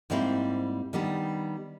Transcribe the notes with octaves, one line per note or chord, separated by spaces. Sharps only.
G#2 G3 A#3 C4 E4
D#3 G3 B3 D4